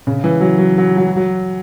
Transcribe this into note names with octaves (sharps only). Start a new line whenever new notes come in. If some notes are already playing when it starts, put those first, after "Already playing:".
C#3
E3
F#3
F#3
F#3
F#3
F#3